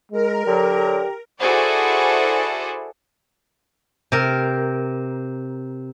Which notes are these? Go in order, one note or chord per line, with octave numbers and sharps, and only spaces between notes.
G#3 A#4
D3 F#3 G4
E4 F#4 G#4 A4 C5 D5
C3 A#4